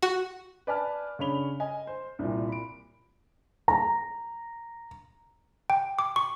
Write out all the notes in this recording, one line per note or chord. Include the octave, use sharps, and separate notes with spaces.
F#4
B4 D5 G#5 A5 F6
C#3 D4 C#5 B5 F7 G7
D#5 G#5
C5
C2 A#2
B5 D7
A#5
G5
D6
C#6